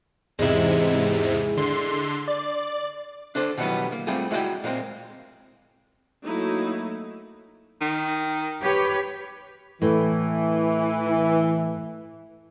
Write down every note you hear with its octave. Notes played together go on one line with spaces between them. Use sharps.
E2 G#2 C3 G#3 E4
D3 C6
D5
D4 A4 C5 D5
B2 D#3 E3 F#3 G3 B3
A#3
G3 A3 C4 D4 F4 G#4
G#3 E4 F#4 B4 D5 G5
A#2 G#3 A#3 C4
F#3 A3 A#3 D#4 E4
D#3
G4 B4 C#5
A2 E3